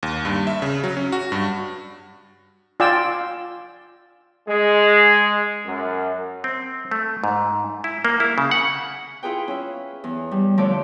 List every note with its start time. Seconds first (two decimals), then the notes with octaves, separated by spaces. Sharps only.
0.03 D#2
0.25 G2
0.47 E5
0.62 C#3
0.84 F#3
0.97 C#4
1.12 F#4
1.32 G2
2.80 F4 D5 G5 G#5 E6
4.48 G#3
5.65 F#2
6.44 C4
6.91 A3
7.24 G#2
7.84 E4
8.05 A#3
8.20 E4
8.38 C#3
8.51 F#5
9.23 E4 F4 G#4 B4 G5
9.48 C#4 E5
10.04 E2
10.31 G3
10.57 D3 F3 A3 E4 C#5 D5